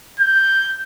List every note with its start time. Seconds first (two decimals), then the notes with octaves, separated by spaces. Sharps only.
0.20 G6